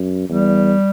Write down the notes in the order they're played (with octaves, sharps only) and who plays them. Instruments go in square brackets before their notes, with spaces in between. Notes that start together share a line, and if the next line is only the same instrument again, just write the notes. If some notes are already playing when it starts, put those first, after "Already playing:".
Already playing: [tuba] F#2
[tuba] E2 [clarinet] G3